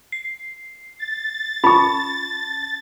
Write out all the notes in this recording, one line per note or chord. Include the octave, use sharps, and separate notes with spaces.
C7
A6
C#4 F4 A5 B5 C#6